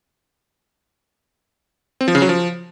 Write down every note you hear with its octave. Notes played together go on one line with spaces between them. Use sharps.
C4
F3
C#3
F#3
F3